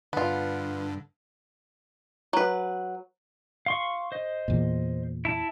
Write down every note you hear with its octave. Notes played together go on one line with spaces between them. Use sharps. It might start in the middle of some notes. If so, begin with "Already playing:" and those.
G2 D3 B3 F4
F#3 B4
F5 C6 C#6
C5 D#5
E2 A#2
E4 A5